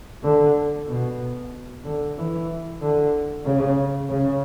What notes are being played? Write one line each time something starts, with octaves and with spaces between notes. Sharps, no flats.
D3
B2
D3
E3
D3
C#3
C#3